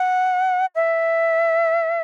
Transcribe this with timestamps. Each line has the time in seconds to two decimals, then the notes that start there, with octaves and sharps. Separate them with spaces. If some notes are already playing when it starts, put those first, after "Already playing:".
Already playing: F#5
0.75 E5